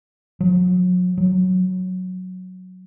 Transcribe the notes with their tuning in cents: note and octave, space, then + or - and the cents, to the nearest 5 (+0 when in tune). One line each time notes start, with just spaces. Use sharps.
F#3 -35
F#3 -5